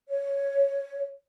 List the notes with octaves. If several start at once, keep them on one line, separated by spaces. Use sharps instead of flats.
C#5